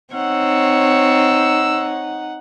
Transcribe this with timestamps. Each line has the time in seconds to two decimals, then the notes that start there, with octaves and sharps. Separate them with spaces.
0.14 C4 D#4 C#5 F#5 E6